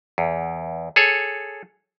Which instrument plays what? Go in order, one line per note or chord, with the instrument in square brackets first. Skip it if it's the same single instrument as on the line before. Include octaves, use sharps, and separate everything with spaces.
[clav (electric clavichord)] E2
G#4 A4 C#5